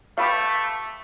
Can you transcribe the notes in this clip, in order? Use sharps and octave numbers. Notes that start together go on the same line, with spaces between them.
A3 G4 B4 F5